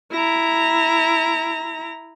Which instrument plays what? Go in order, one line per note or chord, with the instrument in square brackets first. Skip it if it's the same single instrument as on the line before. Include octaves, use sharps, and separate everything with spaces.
[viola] E4 A#5